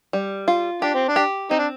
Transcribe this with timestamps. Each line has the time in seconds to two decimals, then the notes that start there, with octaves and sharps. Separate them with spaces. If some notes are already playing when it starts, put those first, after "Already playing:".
0.13 G3
0.48 F4
0.82 D4 G4
0.95 C4
1.08 D4
1.16 G4
1.51 C4 D#4
1.58 D4